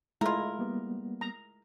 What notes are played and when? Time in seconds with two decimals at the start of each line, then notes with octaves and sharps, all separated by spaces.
0.21 G#3 A3 E4 F4 A#4
0.59 G3 A#3 B3
1.21 A#5